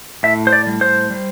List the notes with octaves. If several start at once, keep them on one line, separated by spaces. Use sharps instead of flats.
A2 E5
C5
D5
G3
C5
G3